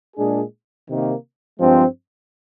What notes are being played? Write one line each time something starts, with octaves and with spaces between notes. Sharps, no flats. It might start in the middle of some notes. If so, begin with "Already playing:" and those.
A#2 G#3 D4 G#4
C3 D#3 A#3
G2 F3 G#3 C4